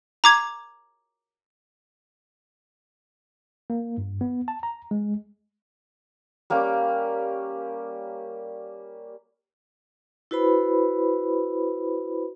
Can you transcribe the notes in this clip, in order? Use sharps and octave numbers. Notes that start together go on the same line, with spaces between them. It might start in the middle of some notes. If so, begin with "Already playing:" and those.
A#5 D6 G#6
A#3
G2
B3
A5
A#5
G#3
G3 A#3 C#4 G4
E4 F#4 B4 C5 B5